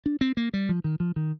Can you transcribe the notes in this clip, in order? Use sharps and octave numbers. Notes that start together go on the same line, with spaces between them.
D4
C4
A#3
G3
F3
D#3
F3
D#3